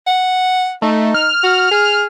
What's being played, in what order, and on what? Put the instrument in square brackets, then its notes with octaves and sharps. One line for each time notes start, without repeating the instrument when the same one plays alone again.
[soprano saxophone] F#5
[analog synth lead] A3 [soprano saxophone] D#4
[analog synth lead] F6
[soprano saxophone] F#4
G#4